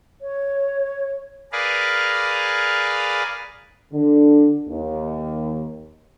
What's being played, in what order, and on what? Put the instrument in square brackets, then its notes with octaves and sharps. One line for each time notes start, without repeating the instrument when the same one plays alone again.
[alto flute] C#5
[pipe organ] G#4 A#4 B4 D5 F5
[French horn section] D3
D#2